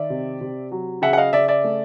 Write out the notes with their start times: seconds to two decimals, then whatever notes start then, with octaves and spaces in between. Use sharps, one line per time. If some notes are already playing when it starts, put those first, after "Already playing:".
Already playing: D#3 D5 E5
0.10 C3
0.41 C3
0.72 F#3
1.02 C#3 E5 F#5
1.13 F#5
1.17 D#5 F5
1.33 C#3 D5 E5
1.48 D5 E5
1.64 A3